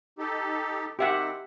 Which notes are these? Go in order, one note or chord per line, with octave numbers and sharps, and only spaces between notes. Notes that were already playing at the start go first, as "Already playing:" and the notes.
D#4 G4 A4
D#3 C4 G4 E5 F#5